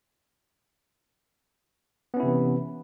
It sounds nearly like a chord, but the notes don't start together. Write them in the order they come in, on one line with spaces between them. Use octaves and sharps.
B3 C#4 E4 C3 E3